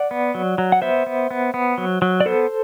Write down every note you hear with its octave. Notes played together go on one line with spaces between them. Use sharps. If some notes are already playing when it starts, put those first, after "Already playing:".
Already playing: D5 F#5
B3
F#3
F#3
F#5
B3 C5 E5
B3
B3
B3
F#3
F#3
D5
B3 A4 C5